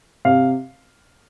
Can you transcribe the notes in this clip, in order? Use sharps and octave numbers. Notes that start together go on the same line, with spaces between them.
C3 F5